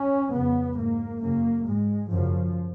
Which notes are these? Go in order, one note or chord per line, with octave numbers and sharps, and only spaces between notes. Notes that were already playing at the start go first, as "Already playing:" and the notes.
Already playing: C#4
F2 C#3 B3
G#2 A#3
F#2 C#3 A#3
G#2 G#3
F#2 C#3 F3